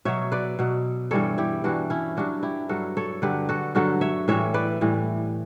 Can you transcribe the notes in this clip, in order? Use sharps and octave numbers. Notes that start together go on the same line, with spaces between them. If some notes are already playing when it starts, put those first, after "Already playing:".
B2 F#3 C#5 E5
B4 D5
B2 F#3
G2 E3 G3 A4 C#5
E4 G4
G2 E3 G3 D4 F#4
C#4 E4
G2 F#3 D4 F#4
E4 G4
G2 F#3 F#4 A4
A4 C#5
G2 D3 F#3 G4 B4
F#4 A4
G2 D3 F#3 F#4 A4
C#5 E5
A2 E3 G3 C#5 E5
B4 D5
A2 E3 G3